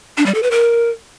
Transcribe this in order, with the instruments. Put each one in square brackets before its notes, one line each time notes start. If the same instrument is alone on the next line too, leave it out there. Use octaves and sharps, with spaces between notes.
[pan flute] D4
G3
A4
B4
A#4